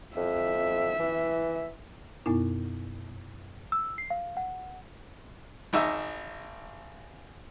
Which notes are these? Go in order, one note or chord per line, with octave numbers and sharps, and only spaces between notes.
F2 E5
E3
F#2 B2 B3 D#4 E4
E6
C7
F5
F#5
G#1 D#4 E5